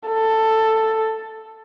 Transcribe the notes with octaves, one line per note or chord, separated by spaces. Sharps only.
A4